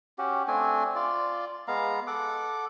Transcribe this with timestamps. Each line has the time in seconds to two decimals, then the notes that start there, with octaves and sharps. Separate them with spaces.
0.18 C#4 F#4 G4
0.48 A3 C4 D4 G#5
0.95 F4 D5
1.68 G#3 B3 F5 A#5
2.07 A4 F#5 D6